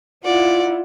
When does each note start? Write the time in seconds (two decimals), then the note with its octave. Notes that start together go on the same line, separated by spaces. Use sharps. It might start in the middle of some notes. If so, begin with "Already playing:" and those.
0.25 E4 F4 D5 F#5